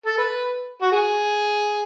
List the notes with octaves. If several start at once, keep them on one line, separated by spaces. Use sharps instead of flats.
A4
B4
F#4
G#4